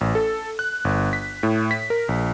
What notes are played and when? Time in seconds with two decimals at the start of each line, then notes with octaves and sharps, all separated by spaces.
0.01 A1
0.15 A4
0.59 F#6
0.85 G1
1.13 B6
1.43 A2
1.71 B6
1.90 A#4
2.09 A#1